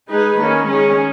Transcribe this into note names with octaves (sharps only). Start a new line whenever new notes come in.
G#3 D#4 G#4 B4
D#3 A#3 C#4
D#3 G#3 C#4 G#4